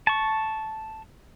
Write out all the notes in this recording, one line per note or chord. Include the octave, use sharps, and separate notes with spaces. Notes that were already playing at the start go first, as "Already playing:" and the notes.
A5 C#6